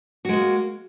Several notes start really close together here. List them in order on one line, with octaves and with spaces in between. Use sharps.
F#4 G#3 A#3